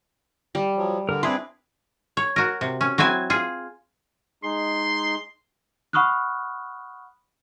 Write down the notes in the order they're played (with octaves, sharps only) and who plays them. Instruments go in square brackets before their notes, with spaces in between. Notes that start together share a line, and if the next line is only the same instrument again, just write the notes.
[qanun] G3
[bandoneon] F3 F#3
[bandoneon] D3 [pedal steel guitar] A#4
[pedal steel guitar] C4 G#4 C6 [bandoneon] D4 E4 [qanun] B4
[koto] C#5
F#4 A#4
C3
C#4
F#3 C4 E4 G#5
F4 G#4
[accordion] G#3 D#4 G#4 [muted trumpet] C6
[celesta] F#5 B5 C#6 D#6 F6 F#6